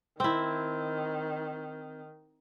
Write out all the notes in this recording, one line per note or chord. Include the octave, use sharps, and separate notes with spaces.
D#3 C4 E4